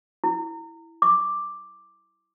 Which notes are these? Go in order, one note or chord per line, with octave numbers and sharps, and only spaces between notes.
E4
D6